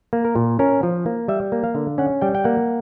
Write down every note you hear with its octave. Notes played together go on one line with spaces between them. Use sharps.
A#3
A#4
A#2
C#4 A#4
F3
A#3
G3 E5
A#3
F5
D3
C#4 F#5
G3 G5
G5
A#3 F#5